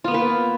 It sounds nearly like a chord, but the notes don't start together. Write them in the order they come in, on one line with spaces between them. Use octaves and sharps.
F4 B3 A#3 B4